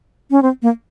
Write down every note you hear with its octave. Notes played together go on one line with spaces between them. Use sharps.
C#4
C4
A#3